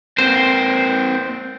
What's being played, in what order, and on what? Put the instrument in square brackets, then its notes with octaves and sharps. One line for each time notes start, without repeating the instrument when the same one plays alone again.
[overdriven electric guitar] A#3 C4 [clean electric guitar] C5